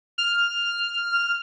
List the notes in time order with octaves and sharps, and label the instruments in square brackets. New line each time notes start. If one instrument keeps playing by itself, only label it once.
[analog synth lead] F6